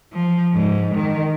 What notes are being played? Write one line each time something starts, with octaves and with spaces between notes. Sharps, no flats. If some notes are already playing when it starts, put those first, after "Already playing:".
F3
G#2
D#3